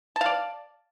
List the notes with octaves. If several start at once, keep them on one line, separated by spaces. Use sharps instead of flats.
D5 F5 A5